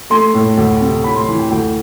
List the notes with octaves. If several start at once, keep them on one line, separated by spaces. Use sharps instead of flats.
A3 C6
A2
D2
C3
A2 B5
C6
E3
G5
D2 G5